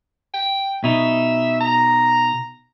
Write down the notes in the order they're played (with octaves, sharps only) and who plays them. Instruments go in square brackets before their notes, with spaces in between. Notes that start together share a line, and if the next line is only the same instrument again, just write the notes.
[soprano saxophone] G5
[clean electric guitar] B2 D#4 [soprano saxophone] E5
[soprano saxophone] A#5